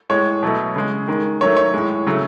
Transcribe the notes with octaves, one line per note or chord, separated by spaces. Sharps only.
A2 G#3 C#5
B2 F#3 A3
C#3 G#3
D#3 G#3
D#3 F#3 A3 C#5
C#5
A2 G#3
C#3 F#3 A3